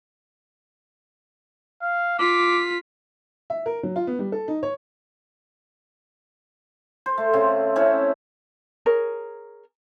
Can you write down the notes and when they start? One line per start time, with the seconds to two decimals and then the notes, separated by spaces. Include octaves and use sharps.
1.82 F5
2.19 F4 D6 B6
3.50 E5
3.66 A#4
3.83 F#3
3.96 F4
4.07 B3
4.19 G3
4.32 A4
4.48 D#4
4.63 C#5
7.06 C5
7.18 A3
7.33 C#3 C4
7.76 C4 C#4 E4 C#5
8.86 G#4 A#4 C#5